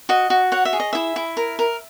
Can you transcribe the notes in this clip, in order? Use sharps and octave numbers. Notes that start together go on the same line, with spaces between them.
F#4 D#5
F#4
C#5 F#5
E5
G#4
D#5
E4 E5
E4
A#4
A#4